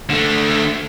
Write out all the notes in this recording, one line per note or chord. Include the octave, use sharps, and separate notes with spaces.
D3 A3